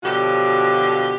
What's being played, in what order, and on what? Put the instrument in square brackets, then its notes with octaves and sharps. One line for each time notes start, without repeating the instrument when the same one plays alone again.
[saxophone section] B2 D3 F3 F#3 F#4 G4